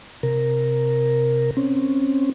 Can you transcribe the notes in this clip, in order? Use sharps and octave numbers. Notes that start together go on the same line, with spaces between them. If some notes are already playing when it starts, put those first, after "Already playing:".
C3 A#4
C4 C#4